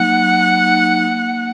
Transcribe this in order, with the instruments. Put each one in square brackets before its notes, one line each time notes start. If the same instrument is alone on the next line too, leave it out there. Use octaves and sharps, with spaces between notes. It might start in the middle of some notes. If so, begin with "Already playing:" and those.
Already playing: [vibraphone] F#3 A#3 D#4 [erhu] F#5
[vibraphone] F#3
A#3 D#4
A#3